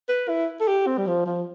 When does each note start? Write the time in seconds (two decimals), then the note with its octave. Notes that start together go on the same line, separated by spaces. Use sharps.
0.08 B4
0.28 E4
0.60 A4
0.67 G4
0.87 C4
0.97 G3
1.07 F3
1.26 F3